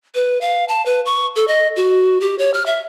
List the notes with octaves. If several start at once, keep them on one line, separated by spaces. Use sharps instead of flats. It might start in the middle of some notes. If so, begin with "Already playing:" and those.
B4
F5
A5
B4
C#6
A4
D#5
F#4
G4
C#5
F6
E5